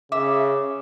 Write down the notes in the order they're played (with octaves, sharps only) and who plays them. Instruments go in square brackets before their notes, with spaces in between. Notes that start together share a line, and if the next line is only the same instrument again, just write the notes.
[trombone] C#3 [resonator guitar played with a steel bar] E5 [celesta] D6